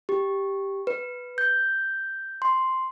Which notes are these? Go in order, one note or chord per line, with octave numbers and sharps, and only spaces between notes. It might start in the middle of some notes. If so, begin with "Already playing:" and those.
G4
B4
G6
C6